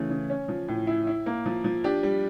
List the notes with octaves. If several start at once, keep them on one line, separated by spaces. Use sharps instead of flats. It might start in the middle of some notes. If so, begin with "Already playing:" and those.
Already playing: C#3 E3 A3
C#3
C#4
F3
A2
E4
E4
A#3
F3
F3
D4 G4
G3